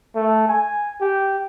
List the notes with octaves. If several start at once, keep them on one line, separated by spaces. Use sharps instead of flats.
A3
G#5
G4